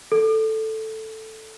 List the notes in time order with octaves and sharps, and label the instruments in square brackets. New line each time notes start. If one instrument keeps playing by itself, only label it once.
[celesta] A4